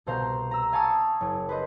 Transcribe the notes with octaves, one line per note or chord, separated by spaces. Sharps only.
C2 B2 C5 F5 A#5 G6
A#5 E6
F5 G#5 A5 C#6 D#6 E6
F#1
B4 C5 D#5